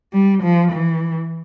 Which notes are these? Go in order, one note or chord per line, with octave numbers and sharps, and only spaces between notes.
G3
F3
E3